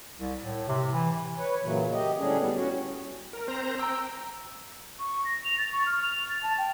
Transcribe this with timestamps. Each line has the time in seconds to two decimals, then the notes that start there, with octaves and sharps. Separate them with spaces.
0.19 C2
0.41 A2
0.68 C3
0.91 E3
1.37 B4 C#5
1.62 A#2 C#3 E3 F#3
1.92 G4 D#5
2.18 A2 D3 G3 C#4 D4 G#4
2.38 D#2 G3 B3
2.55 C#4 F#4
3.33 A#4
3.48 C4 C5 A#5
3.79 G5 A#5 E6
4.99 C#6
5.25 A#6
5.44 F7
5.58 A6
5.73 C#6
5.86 F6
6.03 F7
6.29 A6
6.43 A5
6.58 G5